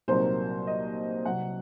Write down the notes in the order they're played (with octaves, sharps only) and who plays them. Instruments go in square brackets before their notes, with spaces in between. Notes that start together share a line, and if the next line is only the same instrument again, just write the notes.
[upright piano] C2 A#2 F#3 A#3 D#4 C5
D#5
C2 C3 F#3 F#5